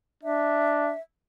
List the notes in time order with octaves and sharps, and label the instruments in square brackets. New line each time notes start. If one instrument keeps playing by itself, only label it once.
[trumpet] D4 [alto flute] E5